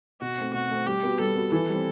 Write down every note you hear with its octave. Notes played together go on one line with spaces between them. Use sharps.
B2 F#4
A3 C4
B2 F#4
A3 C4
G3 G4
B3 F#4
G3 A4
B3 F#4
E3 A4
G3 C4